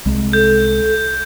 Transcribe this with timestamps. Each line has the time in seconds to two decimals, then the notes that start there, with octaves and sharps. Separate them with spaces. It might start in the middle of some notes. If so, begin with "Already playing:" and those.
0.06 C2 G#3
0.33 A4 G6